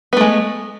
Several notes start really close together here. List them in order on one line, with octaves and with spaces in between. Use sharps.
B3 A3 G#3